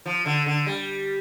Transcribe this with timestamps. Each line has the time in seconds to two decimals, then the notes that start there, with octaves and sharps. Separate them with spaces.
0.06 F3
0.26 D3
0.46 D3
0.66 G3